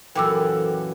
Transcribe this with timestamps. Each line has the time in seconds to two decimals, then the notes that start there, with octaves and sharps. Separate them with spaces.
0.15 F#2 A#2 E3 A4 G5 D6 E6